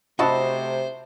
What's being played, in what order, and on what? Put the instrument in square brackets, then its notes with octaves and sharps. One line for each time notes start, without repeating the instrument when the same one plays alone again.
[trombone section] C3 A3 [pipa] E4 F#4 [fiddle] C5 [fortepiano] D#5 A5